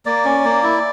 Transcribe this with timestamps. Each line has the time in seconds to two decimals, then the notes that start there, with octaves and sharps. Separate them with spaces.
0.06 A#3 D5
0.25 C#4
0.45 A#3
0.63 E4